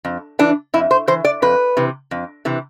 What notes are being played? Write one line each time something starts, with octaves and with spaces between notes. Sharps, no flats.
F2
E3 D4
F2 E4
C5
E3 C5
D5
F2 B4
C3 E3
F2
C3 E3